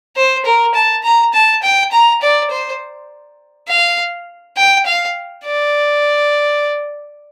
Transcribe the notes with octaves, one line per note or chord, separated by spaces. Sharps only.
C5
A#4
A5
A#5
A5
G5
A#5
D5
C5
F5
G5
F5
D5